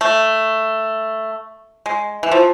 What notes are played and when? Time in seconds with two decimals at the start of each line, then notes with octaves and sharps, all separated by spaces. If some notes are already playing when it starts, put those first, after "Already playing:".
0.01 A3
1.86 G#3
2.23 E3
2.32 F3